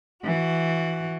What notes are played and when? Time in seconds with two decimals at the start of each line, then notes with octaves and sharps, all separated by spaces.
0.23 E3 F#4